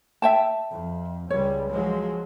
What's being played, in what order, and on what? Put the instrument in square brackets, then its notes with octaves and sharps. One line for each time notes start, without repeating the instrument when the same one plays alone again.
[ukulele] E5 G5 A5
[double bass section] F2
[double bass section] C#2 G3 [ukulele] C#5
[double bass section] F3 F#3 G#3